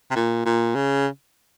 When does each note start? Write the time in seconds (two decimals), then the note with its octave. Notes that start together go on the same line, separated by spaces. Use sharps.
0.11 C3
0.16 A#2
0.46 A#2
0.75 C#3